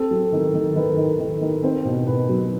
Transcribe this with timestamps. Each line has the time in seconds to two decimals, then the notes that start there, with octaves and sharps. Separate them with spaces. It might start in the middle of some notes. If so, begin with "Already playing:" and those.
Already playing: C4 A4
0.11 F#3
0.32 D#3
0.54 D#3
0.76 D#3 B4
0.97 D#3
1.19 D#3
1.41 D#3
1.63 C4 C5
1.85 B2
2.07 B2 B4
2.29 F#3